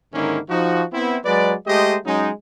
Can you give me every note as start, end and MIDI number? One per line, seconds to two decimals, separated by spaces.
0.14 0.38 44
0.14 0.38 50
0.14 0.38 51
0.14 0.38 58
0.14 0.38 61
0.14 0.38 64
0.49 0.82 53
0.49 0.82 63
0.49 0.82 66
0.93 1.18 59
0.93 1.18 60
0.93 1.18 64
1.24 1.53 54
1.24 1.53 56
1.24 1.53 71
1.24 1.53 74
1.67 1.96 56
1.67 1.96 57
1.67 1.96 67
1.67 1.96 72
1.67 1.96 75
2.05 2.29 54
2.05 2.29 56
2.05 2.29 61
2.05 2.29 63